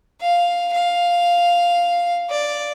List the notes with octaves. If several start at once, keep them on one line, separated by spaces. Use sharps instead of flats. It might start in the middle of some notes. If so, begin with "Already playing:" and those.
F5
F5
D5